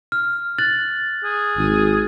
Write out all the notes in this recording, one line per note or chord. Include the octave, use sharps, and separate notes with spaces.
F6
F#6 A6 F#7
G#4
G#1